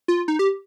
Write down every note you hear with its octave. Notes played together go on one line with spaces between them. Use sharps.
F4
D#4
G4